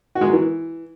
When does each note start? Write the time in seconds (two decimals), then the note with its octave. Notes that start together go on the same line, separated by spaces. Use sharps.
0.15 F#4
0.21 G#3
0.27 F#3
0.33 E3